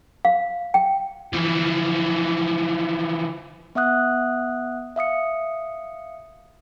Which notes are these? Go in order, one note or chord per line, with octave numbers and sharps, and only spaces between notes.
F5
G5
E3 F3
B3 E5 F#5 D#6 F#6
E5 F5 D#6 C#7